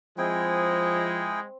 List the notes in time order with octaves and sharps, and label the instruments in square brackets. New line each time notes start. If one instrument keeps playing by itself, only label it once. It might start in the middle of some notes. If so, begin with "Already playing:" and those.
[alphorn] F3 [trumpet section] G#3 [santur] C4 B5 [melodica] E4 G#4 G5